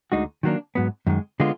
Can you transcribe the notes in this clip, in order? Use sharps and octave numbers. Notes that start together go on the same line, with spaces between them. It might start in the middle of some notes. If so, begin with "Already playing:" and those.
D2 D3 G#3 D#4 F#4
D#3 F#3 A#3 D4
G#2 F#3 B3
F#2 D#3 G#3
D3 G#3 B3 F4